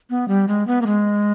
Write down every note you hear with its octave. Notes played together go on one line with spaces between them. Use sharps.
B3
G3
G#3
B3
A#3
G#3